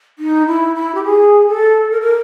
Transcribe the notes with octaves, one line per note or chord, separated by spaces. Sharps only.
D#4
E4
E4
G4
G#4
A4
A#4
A#4